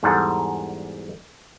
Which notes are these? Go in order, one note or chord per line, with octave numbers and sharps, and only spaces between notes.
E2 G#2 G3 A4 F#5